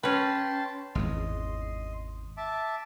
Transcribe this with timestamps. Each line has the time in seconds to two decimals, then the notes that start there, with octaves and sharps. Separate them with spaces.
0.03 C#4 B4 G5 A5 C6
0.95 G#1 E2 D#5 C6
2.37 E5 A5 D6